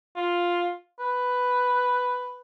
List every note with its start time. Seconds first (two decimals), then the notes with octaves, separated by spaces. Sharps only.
0.16 F4
1.00 B4